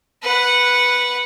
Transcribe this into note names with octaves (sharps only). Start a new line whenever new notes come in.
B4 F#5